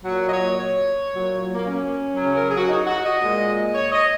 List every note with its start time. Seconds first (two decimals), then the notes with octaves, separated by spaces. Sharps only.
0.04 A#2 F#3 F#4
0.25 D#5
0.30 C#5
0.57 C#5
1.10 A#2 F#3
1.55 A#3
1.62 C#4
2.16 C#3 F#3
2.35 A#4
2.46 G#4
2.56 F#4
2.68 D#4
2.86 F#4
3.03 D#5
3.21 A#2 G#3
3.74 C#5
3.92 D#5